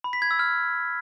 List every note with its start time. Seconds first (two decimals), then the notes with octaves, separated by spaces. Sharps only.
0.04 B5
0.13 B6
0.22 G#6
0.31 E6
0.39 F6